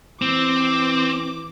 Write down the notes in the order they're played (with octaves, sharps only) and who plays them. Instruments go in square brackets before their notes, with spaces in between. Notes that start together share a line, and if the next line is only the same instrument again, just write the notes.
[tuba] E3 [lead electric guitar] C4 [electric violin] D6